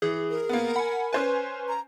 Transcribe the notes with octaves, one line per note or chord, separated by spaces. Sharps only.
E3 G#4
A#4
A#3 B3
F#5 G#5 B5
C#4 B4 C5 G#5
A#5